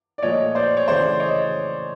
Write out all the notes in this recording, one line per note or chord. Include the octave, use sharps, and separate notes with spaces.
D5
A#2 F3 A3 C#5 D#5
C5 D5
C#5
C#3 E3 A3 C5 D5
C#5 D#5